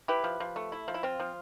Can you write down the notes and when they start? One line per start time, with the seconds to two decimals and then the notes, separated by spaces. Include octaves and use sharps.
0.08 E4 G4 B4
0.24 F3
0.40 F3
0.56 A3
0.72 E4
0.88 F3
0.94 E4
1.03 C4 F4
1.20 F3